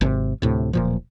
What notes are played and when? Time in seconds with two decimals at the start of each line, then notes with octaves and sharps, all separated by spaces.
0.01 G#1 C3
0.42 D2 A2 C3
0.73 D1 A#2 F3